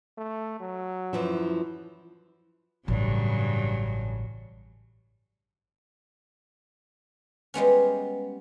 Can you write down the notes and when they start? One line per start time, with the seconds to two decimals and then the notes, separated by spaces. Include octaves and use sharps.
0.18 A3
0.60 F#3
1.13 F#2 E3 F3
2.88 A1 G2 C#3 F#3
7.54 G3 G#3 B3 C#4